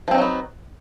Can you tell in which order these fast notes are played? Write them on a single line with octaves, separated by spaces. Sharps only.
F3 C4 D#4 F#3 B3